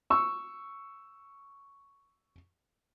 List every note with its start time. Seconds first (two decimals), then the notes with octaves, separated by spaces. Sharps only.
0.10 C#6 E6